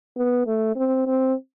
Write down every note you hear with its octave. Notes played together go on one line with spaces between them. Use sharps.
B3
A3
C4
C4